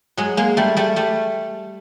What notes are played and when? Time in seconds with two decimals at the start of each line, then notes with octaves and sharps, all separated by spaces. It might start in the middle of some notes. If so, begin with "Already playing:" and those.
0.17 F#3 G#3
0.37 G#3 A#3
0.57 G3 A3
0.77 G3 A3
0.96 G3 A3